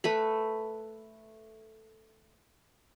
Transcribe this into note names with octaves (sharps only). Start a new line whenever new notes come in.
A3 B4 B5